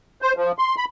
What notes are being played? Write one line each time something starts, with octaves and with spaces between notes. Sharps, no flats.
C5
F3
C6
B5